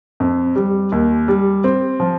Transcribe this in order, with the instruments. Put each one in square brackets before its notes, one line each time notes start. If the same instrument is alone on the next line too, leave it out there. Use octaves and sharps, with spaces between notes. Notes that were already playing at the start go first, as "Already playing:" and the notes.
[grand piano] F2
G3
D#2
G3
C4
F3